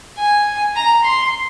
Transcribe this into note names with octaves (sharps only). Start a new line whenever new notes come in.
G#5
A#5
C6